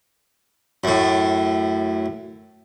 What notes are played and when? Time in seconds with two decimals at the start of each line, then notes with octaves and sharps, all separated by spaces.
0.84 F#2 A2